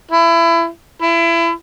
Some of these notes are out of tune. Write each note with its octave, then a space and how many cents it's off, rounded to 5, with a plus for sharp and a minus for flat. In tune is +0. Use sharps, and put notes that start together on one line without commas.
E4 +25
E4 +30